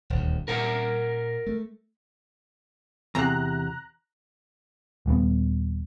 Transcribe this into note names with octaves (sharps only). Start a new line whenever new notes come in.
D#1 D2
A#2 A#4 F#5 A#5
A3
E2 C3 A#5 F#6
D#1 G3 A3 B3